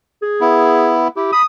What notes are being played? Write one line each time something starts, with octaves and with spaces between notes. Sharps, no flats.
G#4
B3 E4
E4 G4
B5 D#6